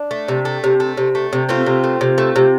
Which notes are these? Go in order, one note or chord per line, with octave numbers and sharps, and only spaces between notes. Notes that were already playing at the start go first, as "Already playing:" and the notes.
Already playing: D4
A3
C3
A3
C3
A3
C3
A3
C3
A3 C4 F4
C3
A3
C3
A3
C3